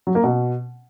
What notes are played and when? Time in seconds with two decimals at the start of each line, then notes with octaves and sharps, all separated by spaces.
0.07 F#3
0.15 A#3
0.24 B2